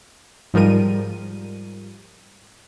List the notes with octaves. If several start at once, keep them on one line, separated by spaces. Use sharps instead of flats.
G#2 F3 G3 A#4 D#7